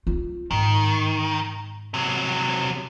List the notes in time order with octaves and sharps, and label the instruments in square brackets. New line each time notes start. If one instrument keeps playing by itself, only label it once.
[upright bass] D#4 F4
[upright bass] G#2 [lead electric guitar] D#3
[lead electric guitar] C3 F#3